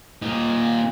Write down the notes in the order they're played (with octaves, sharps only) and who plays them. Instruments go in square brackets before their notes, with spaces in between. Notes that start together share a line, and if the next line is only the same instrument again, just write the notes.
[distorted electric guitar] A#2 D#4